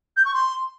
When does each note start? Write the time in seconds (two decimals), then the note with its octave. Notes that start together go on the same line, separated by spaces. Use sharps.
0.17 G6
0.25 C#6
0.34 C6